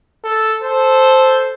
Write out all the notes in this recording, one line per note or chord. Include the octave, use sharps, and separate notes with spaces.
A4
A4 C5